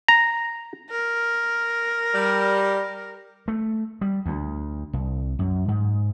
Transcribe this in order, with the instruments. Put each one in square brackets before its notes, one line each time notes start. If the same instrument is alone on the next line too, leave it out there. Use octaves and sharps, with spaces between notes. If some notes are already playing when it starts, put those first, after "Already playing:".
[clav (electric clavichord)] A#5
[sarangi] A#4
[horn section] G3
[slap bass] A3
G3
D2
C2
F#2
G#2